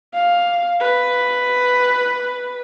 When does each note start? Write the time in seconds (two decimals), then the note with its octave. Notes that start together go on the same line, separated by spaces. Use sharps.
0.13 F5
0.80 B4